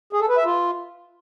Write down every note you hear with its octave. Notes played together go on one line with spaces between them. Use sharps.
G#4
A4
B4
E5
F4